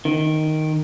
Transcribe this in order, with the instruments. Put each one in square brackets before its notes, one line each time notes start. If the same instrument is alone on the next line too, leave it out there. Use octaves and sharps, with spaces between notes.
[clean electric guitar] D#3